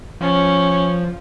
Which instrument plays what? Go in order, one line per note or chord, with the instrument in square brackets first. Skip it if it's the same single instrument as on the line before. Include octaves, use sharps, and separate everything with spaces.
[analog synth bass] F3 [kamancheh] C#4